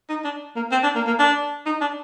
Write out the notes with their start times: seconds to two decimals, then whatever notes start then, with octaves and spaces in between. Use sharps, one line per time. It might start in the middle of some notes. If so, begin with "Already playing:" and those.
0.09 D#4
0.24 D4
0.56 A#3
0.71 C4
0.83 D4
0.95 A#3
1.07 A#3
1.19 D4
1.66 D#4
1.81 D4